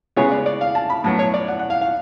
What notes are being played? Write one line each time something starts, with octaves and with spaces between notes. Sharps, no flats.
C#3 G#3 B3 C#5
D5
D5
F5
A5
B5
A2 F#3 B3 A5
C#5
D5
F#5
F#5
F5
F5